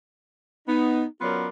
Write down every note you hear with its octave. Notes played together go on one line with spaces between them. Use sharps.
B3 D#4
F#3 B3 C#4 F4 A#4 D5